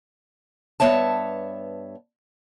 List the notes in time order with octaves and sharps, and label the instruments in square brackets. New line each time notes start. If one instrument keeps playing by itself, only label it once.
[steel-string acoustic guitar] G2 E3 B3 C#5 E5 A5